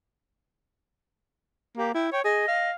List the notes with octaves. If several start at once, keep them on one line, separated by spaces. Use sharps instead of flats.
A#3 G4
E4 G5
C#5 G5
G#4 D#5
F5